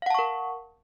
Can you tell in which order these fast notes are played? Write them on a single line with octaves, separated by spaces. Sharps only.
F5 F#5 A5 C#6 A#4